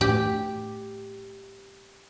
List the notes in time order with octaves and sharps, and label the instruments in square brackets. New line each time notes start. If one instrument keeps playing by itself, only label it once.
[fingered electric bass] A2 [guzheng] G4